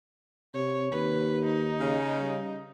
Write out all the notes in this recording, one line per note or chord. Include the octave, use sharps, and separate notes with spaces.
C3 C#5
D#2 B4
D#4
C#3
G3